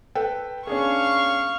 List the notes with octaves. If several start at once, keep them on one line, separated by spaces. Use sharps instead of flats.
A4 B4 G5
C#4 D4 G#4 F5 C#6